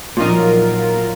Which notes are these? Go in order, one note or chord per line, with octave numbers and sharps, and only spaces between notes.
A#1 A#2 F#3 D#4 F4 A#4